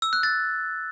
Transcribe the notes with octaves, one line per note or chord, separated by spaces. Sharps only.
E6
F#6
A6